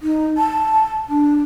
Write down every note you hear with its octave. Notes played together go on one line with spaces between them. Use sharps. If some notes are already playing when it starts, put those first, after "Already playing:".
D#4
A5
D4